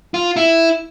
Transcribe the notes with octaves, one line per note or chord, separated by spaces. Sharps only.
F4
E4